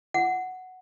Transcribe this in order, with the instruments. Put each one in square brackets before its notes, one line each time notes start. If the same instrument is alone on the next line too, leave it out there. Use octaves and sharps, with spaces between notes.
[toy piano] F#5